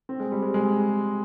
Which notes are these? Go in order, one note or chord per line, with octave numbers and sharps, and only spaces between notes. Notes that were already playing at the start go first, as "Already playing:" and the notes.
C4
G#3
G3
G#3
G#3